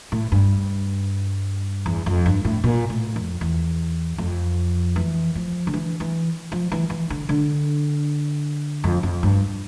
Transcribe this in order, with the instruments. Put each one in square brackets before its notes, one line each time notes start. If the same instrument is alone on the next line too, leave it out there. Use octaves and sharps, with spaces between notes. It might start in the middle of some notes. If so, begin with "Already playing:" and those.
[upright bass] A2
G2
E2
F2
G2
A2
A#2
A2
F2
E2
F2
E3
F3
D3
E3
E3
F3
E3
E3
D3
D3
F2
F2
G2